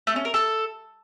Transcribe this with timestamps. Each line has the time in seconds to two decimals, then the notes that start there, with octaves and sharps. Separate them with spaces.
0.07 A3
0.16 C#4
0.25 A#4
0.34 A4